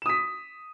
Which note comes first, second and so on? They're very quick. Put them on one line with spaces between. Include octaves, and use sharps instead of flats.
E7 D#6 B6